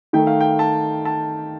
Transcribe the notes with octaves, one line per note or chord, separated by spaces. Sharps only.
D#3 A3 D#4 G5
F5
G5
A5
A5